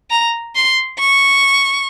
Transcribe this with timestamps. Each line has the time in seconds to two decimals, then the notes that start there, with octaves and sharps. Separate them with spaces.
0.10 A#5
0.55 C6
1.00 C#6